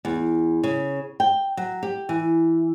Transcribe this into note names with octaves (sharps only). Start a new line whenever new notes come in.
E2
C#3
G5
F#3
G4
E3